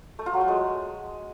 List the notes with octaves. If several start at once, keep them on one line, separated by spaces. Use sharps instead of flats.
A3
F4
F#3
A3
G#3